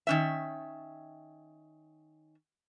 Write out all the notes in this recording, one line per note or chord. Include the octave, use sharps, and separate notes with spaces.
D#3 C#4 E5